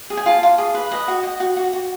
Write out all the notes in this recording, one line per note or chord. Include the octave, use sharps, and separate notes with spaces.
G#4
G#5
F4 A5
F4
G#4
B4
B4 D#5
F#4
D#5
F#4
F#4
F#4